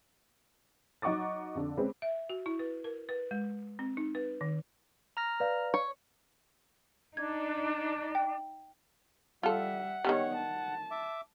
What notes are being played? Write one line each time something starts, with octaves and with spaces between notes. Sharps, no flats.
F#3 D#4 F#5 C#6 D6 A6
F2 D3
G#3 C4 C#4 B4
E5
F#4
E4
B4
A#4
B4
G#3
C4
D#4
B4
D#3
A#5 F6 A#6
B4 D5 F5
C#5
D4 D#4 G#6
G5
G3 F4 A4 E5 F#5
D#3 E3 G3 B3 C#5
A5
E5 D6